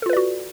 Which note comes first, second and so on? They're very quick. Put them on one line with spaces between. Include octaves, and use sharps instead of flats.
A4 F4 B4 D5 F#4